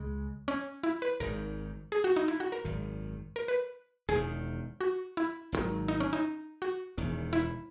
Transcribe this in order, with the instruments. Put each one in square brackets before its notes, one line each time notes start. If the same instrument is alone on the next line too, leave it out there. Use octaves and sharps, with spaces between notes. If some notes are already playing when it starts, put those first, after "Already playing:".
Already playing: [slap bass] C#2 C#3 G#3
[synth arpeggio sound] C#4
E4
B4
[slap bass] G#1 G#2 D#3 [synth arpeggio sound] A#4
[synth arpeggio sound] G#4
F#4
D#4
E4
F#4
A#4
[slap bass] G#1 F#2 D#3
[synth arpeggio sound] A#4
B4
[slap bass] E1 E2 D#3 [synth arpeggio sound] G#4
[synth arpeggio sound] F#4
E4
[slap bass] G#1 F#2 D#3 F#3
[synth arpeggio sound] D#4
C#4
D#4
F#4
[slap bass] E1 E2 D#3
[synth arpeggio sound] E4